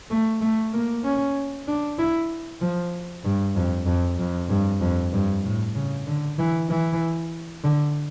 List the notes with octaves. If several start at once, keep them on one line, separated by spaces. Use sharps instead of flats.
A3
A3
A#3
C#4
D4
E4
F3
G2
F2
F2
F2
G2
F2
G2
A2
C#3
D3
E3
E3
D3